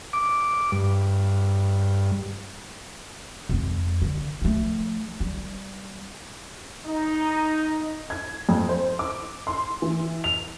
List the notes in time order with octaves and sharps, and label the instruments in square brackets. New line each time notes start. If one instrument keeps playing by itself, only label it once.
[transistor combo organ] D6
G2
[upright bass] F2 G#3
D3
F3 A3
G3
[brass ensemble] D#4
[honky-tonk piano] G#6
F2
C5
D6
C6
E3
F7